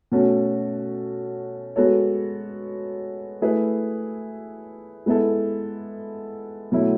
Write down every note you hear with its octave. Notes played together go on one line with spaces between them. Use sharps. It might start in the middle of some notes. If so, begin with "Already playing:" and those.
B2 A3 C#4 F#4 A4
G#3 B3 F#4 A4 C#5
A3 E4 G#4 B4
G#3 B3 E4 A4
B2 F#3 A3 E4